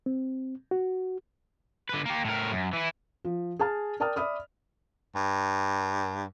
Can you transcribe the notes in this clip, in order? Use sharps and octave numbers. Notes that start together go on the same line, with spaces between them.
C4
F#4
D3 B4
A#3 G4
A2 A#4
F#2
E3 E4
F3
G#4 G#5 A5 F6
A#4 D5 G5 A5 D#6 F6
D5 E5 B5 D#6 F6
G2